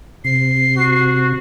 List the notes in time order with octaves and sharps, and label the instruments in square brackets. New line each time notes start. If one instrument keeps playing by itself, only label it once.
[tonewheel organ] C3 [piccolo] C7
[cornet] F#4